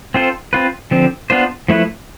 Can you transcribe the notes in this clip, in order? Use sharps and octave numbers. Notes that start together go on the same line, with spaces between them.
C4 F4 A4 C5
C4 F4 B4
D3 F3 C4
B3 D4 F4 C5
F3 A3 E4 B4